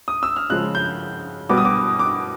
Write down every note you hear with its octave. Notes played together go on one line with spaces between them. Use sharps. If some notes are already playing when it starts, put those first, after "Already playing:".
D#6
E6
F6
C#3 F3 G#3 F#6
G6
B2 G3 B3 D6
D#6
D6
D6